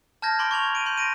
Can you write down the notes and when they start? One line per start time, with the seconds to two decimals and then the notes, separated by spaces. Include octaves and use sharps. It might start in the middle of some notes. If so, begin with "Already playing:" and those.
0.22 A5 F6 G6 G#6 A#6
0.39 B5 C6 D6 D7 G7
0.51 C#6 G#6 F7 F#7
0.75 D7 D#7
0.86 C6 G6
0.97 A#6 D7 D#7